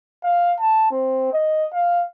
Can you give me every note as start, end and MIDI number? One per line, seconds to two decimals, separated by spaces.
0.24 0.53 77
0.60 0.90 81
0.91 1.30 60
1.33 1.67 75
1.74 2.04 77